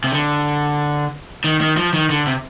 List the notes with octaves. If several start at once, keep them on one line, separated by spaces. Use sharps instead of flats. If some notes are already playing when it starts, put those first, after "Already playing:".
C3
D3
D#3
D#3
F3
D#3
D3
C3